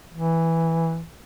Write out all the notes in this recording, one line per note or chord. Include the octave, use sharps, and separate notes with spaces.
E3